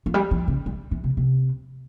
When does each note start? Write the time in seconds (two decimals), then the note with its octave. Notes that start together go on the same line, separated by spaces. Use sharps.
0.06 F3
0.14 G3
0.31 E3
0.48 C#3
0.66 G3
0.91 E3
1.04 C3
1.17 C3